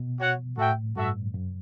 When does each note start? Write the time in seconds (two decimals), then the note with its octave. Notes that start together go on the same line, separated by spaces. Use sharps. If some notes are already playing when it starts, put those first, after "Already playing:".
Already playing: B2
0.19 F#4 C#5 F#5
0.57 A2 F#4 A4 E5 G5
0.95 G2 F#4 A4 E5
1.34 F#2